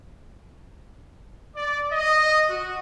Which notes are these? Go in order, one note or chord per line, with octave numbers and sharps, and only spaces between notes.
D5
D#5
F#4